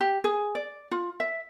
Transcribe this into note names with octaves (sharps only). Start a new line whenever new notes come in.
G4
G#4
D5
F4
E5